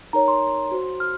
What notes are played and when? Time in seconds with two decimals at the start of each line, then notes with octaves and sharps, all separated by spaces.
0.13 D#4 A#4 C#5 A#5
0.28 C6
0.71 F#4 C5
1.00 F6